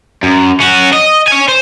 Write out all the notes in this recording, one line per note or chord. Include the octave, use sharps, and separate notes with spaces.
F#2
C#4 F#4
D#5
C#5 G#5
C5